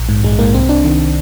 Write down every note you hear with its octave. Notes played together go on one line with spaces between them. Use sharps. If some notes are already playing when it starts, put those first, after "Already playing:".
Already playing: A#1
G#2
A#1 G#3
G#2 A#3
C2 C4
C2 D4
D#3